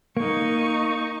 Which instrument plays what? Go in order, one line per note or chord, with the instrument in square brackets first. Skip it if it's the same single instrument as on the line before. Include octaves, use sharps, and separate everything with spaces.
[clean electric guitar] A#3 [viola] D#4 C#6